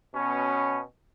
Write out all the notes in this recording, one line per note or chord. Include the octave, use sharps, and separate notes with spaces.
B2 C#4